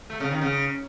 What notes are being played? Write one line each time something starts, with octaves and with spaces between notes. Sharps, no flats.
A3
C#3
D#3
C#3